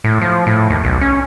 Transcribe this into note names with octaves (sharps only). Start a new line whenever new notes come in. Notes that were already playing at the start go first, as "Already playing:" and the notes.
A2
F3
A2
D#2
B1
C#4